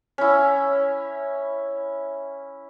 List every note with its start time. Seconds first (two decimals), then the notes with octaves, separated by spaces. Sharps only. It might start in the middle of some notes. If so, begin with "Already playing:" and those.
0.18 C#4 E4